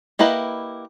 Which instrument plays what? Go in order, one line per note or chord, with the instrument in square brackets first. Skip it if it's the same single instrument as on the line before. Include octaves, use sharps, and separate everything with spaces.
[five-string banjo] A#3 E4 G4 B4 D#5